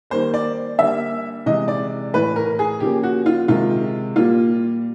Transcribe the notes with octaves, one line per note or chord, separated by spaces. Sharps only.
D#3 G3 A#3 C5
D5
D3 G3 A#3 E5
C3 E3 G#3 D#5
D5
A2 E3 A3 B4
A#4
G#4
C#3 F3 A#3 G4
F#4
F4
C3 D#3 G#3 F4
A#2 G3 A#3 F4